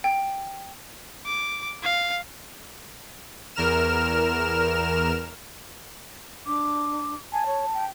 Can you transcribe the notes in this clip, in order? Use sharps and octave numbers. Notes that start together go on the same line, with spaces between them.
G5
D6
F5
E2 A#4 F6 E7
D4 D6
G#5 A5
C#5
G5